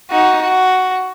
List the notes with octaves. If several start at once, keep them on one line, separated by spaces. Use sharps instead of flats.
D#4 F#4
F#4